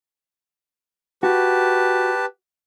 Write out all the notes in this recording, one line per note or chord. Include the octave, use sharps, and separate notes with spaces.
F#4 G4 B4 A5